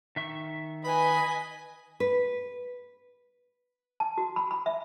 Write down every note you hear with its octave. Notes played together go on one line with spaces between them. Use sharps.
D#3 E5 C#6
B4 D#5 G#5 B5
B4
A5
F#4
B5
B5
E5